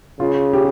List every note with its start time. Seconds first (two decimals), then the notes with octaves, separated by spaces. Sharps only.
0.20 C#3 F4
0.53 G4